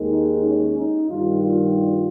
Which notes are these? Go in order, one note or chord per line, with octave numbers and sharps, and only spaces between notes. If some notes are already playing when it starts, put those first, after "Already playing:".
Already playing: D#2 D#3 G#3
D#4
C#4
D#4
G2 D#3 G3 F4
F4